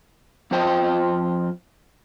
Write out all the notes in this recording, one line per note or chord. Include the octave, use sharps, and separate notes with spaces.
F2 F3 F4 C5 D#5 G5